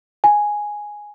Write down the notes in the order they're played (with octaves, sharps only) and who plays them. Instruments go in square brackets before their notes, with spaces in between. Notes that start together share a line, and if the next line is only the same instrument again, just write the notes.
[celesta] G#5